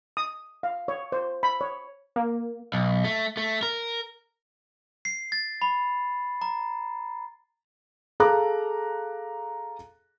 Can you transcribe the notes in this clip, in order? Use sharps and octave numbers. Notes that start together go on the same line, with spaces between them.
D#6
F5
C#5
C5
B5
C#5
A#3
B1
A3
A3
A#4
C7
A6
B5
A#5
G#4 A4 F5 A#5 D6 F#6